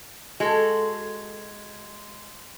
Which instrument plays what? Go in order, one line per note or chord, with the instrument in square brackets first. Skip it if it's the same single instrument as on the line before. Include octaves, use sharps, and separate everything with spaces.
[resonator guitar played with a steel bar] G#3 [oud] F#4 A4